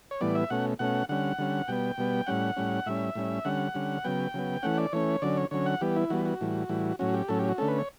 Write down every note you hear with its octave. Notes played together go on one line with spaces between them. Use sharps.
C#5
A2 E3 G3 B3 D5
E5
B2 A3 C#4 F#5
B2 A3 C#4 F#5
D3 G3 C#4 F#5
D3 G3 C#4
B2 G3 B3 G5
B2 G3 B3
A2 G3 C#4 F#5
A2 G3 C#4
A2 G3 C#4 E5
A2 G3 C#4
D3 G3 C#4 F#5
D3 G3 C#4
C#3 F#3 B3 G5
C#3 F#3 B3
E3 A3 C#4 F#5
D5
E3 A3 C#4 C#5
D3 F#3 C#4 D5
C#5
D3 F#3 C#4 C#5
F#5
E3 G3 B3 G4
E4
E3 G3 B3 F#4
F#4
A2 E3 G3
A2 E3 G3
A2 F#3 C#4 F#4
G4
A2 F#3 C#4 A4
G4
F#4
D3 A3 C#4 A4
B4
C#5